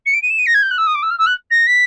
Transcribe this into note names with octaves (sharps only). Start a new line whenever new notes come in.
C#7
D7
D#7
E7
D#7
A#6
G#6
G6
F#6
E6
D#6
D6
E6
F6
E6
F#6
A#6
B6